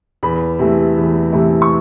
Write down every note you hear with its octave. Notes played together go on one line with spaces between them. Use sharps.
E2 B5
C3 E3 A3
E2
C3 E3 A3
C#6